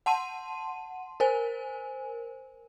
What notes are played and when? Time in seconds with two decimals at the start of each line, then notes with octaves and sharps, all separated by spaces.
0.06 F#5 A5 C6 D#7
1.20 A#4 C5 G#5